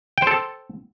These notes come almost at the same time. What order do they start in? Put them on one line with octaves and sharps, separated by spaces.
G5 C5 A4